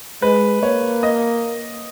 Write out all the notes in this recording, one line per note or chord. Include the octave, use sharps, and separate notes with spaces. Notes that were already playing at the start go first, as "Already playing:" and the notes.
G#3 B4
A#3 C#5
D#5